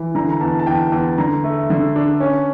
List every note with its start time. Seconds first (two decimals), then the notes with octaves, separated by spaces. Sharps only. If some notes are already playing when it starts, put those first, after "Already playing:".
Already playing: E3
0.15 D3 A#5
0.30 A#5
0.41 E2 A5
0.60 A5
0.67 E2 G5
0.92 E2
1.18 D3 A#5
1.44 A3
1.70 D3
1.96 D4
2.20 C#4